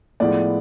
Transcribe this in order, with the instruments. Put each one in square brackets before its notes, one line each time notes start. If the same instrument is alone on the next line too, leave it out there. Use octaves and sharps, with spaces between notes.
[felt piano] A2 F3 G#3 B3 D5